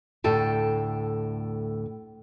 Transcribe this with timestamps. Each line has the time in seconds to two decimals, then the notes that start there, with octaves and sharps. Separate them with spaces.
0.24 D2 A2 A4 G5